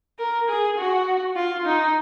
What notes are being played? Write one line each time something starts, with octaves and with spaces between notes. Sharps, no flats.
A#4
G#4
F#4
F4
D#4